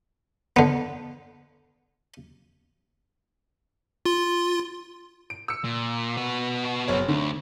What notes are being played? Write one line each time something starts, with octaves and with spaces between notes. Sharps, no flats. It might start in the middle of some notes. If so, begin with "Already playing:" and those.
D3 B3
F4 C6
D7
E6 C#7
A#2
B3 F#4
F#1 C#5
D2 D3